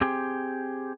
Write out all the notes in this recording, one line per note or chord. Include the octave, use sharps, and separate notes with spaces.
C4 G4 G#4 G5